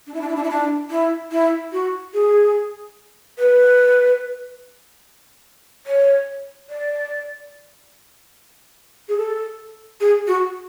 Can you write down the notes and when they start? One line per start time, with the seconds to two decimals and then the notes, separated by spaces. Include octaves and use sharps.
0.07 D4
0.14 E4
0.21 D4
0.29 E4
0.36 D4
0.44 E4
0.50 D4
0.90 E4
1.32 E4
1.72 F#4
2.14 G#4
3.38 B4
5.87 C#5
6.69 D5
9.09 G#4
9.18 A4
10.01 G#4
10.27 F#4